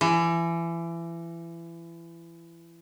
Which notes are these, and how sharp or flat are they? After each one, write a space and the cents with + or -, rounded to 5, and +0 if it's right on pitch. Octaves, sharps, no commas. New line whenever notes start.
E3 +30